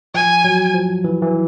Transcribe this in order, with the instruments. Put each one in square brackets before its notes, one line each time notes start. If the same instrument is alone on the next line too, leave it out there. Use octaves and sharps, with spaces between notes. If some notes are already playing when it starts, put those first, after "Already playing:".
[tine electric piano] F3 [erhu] G#5
[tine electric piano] F#3
F3
E3
E3